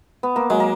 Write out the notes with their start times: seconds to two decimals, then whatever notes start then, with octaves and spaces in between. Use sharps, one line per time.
0.23 B3
0.36 A#3
0.50 F#3 G#3
0.60 A#3